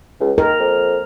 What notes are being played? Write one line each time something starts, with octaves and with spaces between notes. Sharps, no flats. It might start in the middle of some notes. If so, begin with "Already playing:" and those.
C#2
D#3 A#4
F2